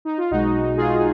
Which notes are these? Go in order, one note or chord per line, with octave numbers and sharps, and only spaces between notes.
D#4
F4
B1 B2 G#3 D#4 F#4
F4 G#4